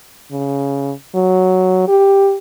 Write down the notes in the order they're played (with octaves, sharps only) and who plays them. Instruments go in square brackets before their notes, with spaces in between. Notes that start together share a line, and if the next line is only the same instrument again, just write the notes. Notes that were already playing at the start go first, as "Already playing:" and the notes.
[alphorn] C#3
F#3
G4